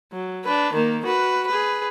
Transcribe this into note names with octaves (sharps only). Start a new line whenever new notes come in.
F#3
D4 B4
D#3 A#3
F#4 B4
G#4 B4